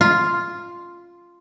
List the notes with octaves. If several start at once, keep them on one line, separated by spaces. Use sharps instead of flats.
F4